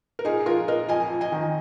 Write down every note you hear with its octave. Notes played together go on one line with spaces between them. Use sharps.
A#4
A#2 D#4 G#4
F3 F4 A#4
A#2 A#4 D#5
F2 D#5 G#5
F2
D#5 G#5
D#3